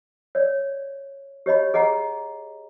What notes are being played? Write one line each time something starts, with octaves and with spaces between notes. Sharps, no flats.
C#5 D5
G4 C#5 D#5 B5
G#4 D#5 F#5 A#5